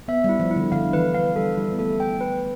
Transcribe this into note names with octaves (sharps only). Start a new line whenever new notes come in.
B3 E5
G3
E4
F3
E4
D3
D3 F5
E3 B4
F5
G3 A4
G3 E4
B3
A3 A4
G5
B4